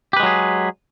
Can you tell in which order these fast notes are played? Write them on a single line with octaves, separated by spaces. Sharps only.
G4 B4 G#3 F#3 G#4